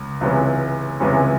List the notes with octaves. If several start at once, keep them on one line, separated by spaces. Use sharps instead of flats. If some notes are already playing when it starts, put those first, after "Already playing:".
Already playing: C#2
C#2 C3 E3 G#3 C#4
C#2 C3 E3 G#3 C#4